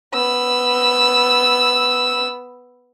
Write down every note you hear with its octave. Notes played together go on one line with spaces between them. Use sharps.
B3 E6